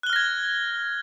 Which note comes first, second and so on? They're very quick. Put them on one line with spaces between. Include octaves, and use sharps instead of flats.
F#6 G7 F6 A#6 G#6